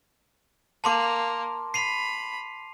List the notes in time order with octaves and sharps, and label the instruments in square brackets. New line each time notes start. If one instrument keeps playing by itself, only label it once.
[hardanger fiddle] A#3 [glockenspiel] A5 C6 D6
[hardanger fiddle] B5 [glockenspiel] C7 D#7 F7